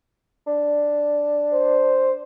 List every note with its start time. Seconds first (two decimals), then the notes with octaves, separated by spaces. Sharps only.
0.47 D4
1.53 C5